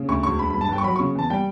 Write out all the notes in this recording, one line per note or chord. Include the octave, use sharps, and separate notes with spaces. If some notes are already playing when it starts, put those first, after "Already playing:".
Already playing: C#3
D2 C#6
E1 C#6
D3 B5
G2 B5
A5
G1 G5
C#6
F#3 B5
C#3 C#6
E2 A5
G3 G5